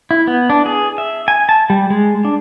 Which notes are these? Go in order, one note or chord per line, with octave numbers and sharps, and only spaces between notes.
E4
B3
D4
G#4
E5
G#5
A5
G3
G#3
D4